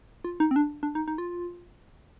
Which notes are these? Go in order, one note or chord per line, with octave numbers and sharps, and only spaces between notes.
F4
D#4
C4
D4
D4
D#4
D#4
F4